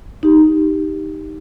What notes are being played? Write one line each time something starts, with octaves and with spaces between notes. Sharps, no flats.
D#4 G4